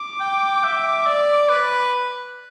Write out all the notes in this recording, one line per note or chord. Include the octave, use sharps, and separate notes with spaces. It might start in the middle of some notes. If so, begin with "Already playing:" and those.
Already playing: D6
G5
E5
D5
B4 B5